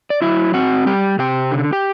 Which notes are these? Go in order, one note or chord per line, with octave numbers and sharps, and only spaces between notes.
D5
F#3 E4 E5
C4 F#4 F#5
G3 G4 G5
C3 G4 G5
D3
G4 G5